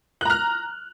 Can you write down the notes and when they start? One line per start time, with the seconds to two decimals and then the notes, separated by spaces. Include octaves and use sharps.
0.21 F#6
0.25 A#5
0.30 F6